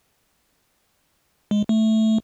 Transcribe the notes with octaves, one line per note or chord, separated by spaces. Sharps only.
G#3
A3